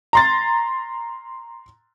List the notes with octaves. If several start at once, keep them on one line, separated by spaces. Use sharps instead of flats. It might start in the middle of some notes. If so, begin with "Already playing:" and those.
A#5 C6 A6